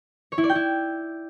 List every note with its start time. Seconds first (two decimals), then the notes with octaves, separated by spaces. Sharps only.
0.32 C#5
0.38 E4
0.44 D5
0.49 G5
0.55 E4